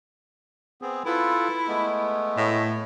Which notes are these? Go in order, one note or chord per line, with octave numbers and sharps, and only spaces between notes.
B3 C4 G#4
E4 F4 A4 B4
G#3 A3 B3
A2